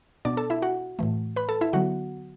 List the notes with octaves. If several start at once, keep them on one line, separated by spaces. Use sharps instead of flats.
B2 B3 D4 D5 D6
A4 A5
E4 E5
F#4 F#5
A2 E3 A3
B4 B5
A4 A5
E4 E5
D3 F#3 B3 F#4 F#5